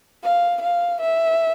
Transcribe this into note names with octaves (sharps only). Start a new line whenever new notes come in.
F5
F5
E5